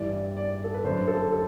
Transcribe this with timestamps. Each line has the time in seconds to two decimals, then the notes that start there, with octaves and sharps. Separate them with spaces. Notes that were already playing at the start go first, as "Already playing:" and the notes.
Already playing: G2 E3 D5
0.12 D5
0.37 D5
0.64 A4
0.74 B4
0.84 F#2 D3 C5
1.08 A4
1.33 A4